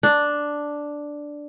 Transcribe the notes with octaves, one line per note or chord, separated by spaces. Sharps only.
D4